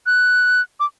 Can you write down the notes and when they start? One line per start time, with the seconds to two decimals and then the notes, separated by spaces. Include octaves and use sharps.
0.06 F#6
0.80 D6